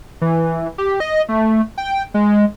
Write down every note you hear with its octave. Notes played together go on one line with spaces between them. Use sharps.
E3
G4
D#5
A3
G5
G#3